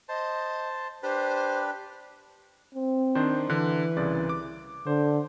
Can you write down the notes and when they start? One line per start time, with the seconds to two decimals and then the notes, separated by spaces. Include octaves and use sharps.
0.09 C5 D#5 A5
1.03 D4 G4 B4 C5
2.75 C4
3.15 D#3 D4 C5
3.50 D3 E3 F#6
3.97 C2 C#3 D5
4.29 D6
4.87 D3 C5